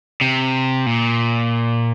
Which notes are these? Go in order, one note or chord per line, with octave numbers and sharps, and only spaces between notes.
C3
A#2